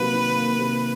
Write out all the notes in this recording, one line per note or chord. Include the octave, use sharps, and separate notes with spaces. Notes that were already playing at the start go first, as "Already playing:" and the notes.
Already playing: C3 D#3 F#3 A#3 B4
D#3
A#3
C3